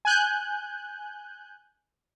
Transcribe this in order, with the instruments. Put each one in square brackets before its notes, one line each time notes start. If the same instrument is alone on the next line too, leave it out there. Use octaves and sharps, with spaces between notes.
[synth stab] G#5 F#6 G6